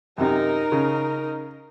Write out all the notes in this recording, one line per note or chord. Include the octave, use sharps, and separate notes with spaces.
F#2 C3 D#4 A#4
C#3